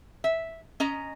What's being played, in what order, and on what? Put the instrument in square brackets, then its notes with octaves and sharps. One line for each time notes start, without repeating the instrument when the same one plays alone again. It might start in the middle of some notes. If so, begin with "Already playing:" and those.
[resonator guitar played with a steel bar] E5
C#4 D#5 A#5